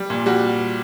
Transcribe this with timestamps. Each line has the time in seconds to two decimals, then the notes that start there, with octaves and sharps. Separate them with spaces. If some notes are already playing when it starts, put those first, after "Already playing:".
Already playing: G3
0.10 A#2
0.26 G3 F#4